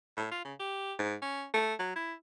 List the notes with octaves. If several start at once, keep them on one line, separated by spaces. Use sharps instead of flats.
A2
F4
C#3
G4
G#2
C#4
A3
F#3
E4